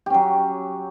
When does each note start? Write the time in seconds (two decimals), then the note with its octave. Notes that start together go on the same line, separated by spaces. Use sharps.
0.06 G4
0.10 C#4
0.14 F#3